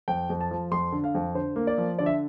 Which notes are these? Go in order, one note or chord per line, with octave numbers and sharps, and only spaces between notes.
F2 G5
F2
A5
F3
F2 C6
D3
F5
F2
D3 C5
A#3
D5
F3
D3 D5
E5